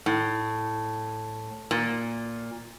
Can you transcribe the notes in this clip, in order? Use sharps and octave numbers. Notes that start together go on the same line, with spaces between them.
A2
A#2